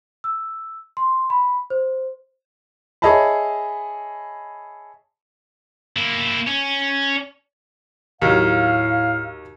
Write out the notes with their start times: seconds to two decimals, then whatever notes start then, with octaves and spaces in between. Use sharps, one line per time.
0.24 E6
0.97 C6
1.30 B5
1.70 C5
3.02 G#4 C#5 D#5 E5 A5 B5
5.97 A#3 E4
6.47 C#4
8.22 D#2 A2 F#3 F5